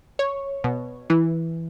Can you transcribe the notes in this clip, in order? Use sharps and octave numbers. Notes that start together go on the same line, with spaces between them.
C#5
B2
E3